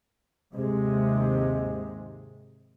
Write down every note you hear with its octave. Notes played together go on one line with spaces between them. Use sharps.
D#2 G#2 C3 G#3